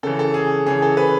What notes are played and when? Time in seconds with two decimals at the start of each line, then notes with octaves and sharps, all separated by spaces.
0.03 C#3 E3 A4
0.19 A4
0.34 G#4
0.66 C#3 E3 G#4
0.82 A4
0.97 B4